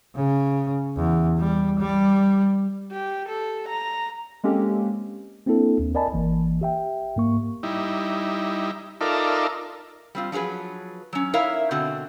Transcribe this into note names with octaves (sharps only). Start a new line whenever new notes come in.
C#3
E2
G3
G3
G4
A4
A#5
G#3 A#3 C4 C#4 G4 A4
A#3 C4 D4 E4 A4
D#2
A#4 D5 D#5 G#5 A5 B5
G#1 E3 A#3
G4 E5 G5
G#2 A#3 C#6
G3 D#4 E4
D#4 F4 A4 A#4 D5 E5
G3 C4 F4
F3 F#3 G4 G#4 B4
F#3 C#4
D#4 E4 A#4 C#5 E5 F5
B2 D3 C4 F#4